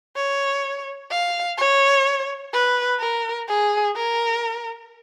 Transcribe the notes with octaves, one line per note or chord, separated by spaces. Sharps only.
C#5
F5
C#5
B4
A#4
G#4
A#4